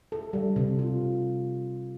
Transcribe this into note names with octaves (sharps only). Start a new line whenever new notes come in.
A4
G3
C3
F4